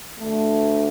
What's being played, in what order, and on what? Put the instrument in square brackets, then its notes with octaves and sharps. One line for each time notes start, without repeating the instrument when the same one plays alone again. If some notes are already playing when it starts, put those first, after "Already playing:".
[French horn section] D2 D3 A3